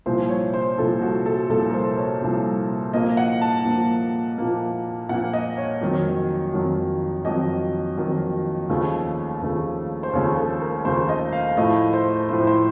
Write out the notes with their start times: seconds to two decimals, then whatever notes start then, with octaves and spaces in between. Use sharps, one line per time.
0.06 C2 A#2 F3 C5
0.29 C#5
0.54 C5
0.78 C2 A#2 F3 A4
1.02 F#4
1.26 A4
1.49 C2 A#2 F3 A4
1.70 A#4
1.74 C5
1.98 C#5
2.22 C2 A#2 F3
2.93 A#2 F3 A#3 D#5
3.17 F#5
3.41 A5
3.65 A#2 F3 A#3
4.38 A#2 F3 A#3
5.09 A#2 F3 A#3 F#5
5.33 D#5
5.57 C#5
5.81 F2 D#3 F#3
6.54 F2 D#3 F#3
7.25 F2 D#3 F#3 D#5
7.97 F2 D#3 F#3
8.69 D#2 C#3 F3 A3
9.42 D#2 C#3 F3 A3
10.03 C5
10.13 D#2 C#3 F3 A3 C#5
10.37 A4
10.61 A#4
10.85 D#2 C#3 F3 A3 C5
11.09 D#5
11.32 F5
11.57 A2 F3 A3 D#5
11.93 C5
12.29 A2 F3 A3 C5
12.47 C5